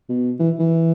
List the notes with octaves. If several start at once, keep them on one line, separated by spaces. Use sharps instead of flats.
B2
E3
E3